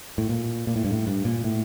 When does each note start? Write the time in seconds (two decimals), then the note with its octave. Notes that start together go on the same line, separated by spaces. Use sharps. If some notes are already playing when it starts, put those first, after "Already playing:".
0.18 A2
0.29 A#2
0.67 A#2
0.76 A2
0.85 G2
0.92 A2
1.07 G2
1.25 A#2
1.44 A2